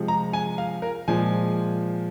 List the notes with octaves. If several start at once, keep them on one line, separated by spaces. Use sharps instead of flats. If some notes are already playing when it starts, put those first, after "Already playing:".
Already playing: C3 F3 G#3
A#5
G#5
F5
A#4
A#2 F3 G#3 G#5